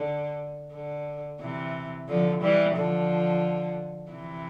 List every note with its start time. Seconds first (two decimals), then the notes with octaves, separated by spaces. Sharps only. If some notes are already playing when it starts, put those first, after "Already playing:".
Already playing: D3
0.74 D3
1.41 C3 E3
2.09 D3 F3
2.42 E3 G3
2.76 D3 F3
4.12 C3 E3